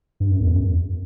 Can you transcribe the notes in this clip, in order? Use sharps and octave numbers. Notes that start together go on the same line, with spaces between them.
G2
F#2
E2
F#2